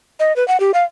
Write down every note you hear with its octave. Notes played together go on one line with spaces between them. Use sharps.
D#5
B4
F#5
G4
F5